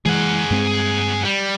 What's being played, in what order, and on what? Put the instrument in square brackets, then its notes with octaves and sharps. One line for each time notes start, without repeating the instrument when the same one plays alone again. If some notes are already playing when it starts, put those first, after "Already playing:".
[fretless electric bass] E3 G#3 [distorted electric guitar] G#4 F#5
[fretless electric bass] G2 G#3 C4
[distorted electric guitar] G3